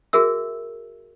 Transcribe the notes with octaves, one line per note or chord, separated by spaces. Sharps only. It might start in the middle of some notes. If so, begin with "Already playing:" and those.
F#4 G#4 A#4 E5 E6